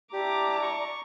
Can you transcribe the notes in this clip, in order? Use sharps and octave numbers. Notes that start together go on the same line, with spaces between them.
D4 E4 G4 D5 A5 A#5 D6
C#6